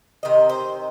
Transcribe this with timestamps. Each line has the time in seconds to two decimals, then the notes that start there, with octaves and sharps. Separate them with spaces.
0.23 C3 D#3 D#5
0.49 C5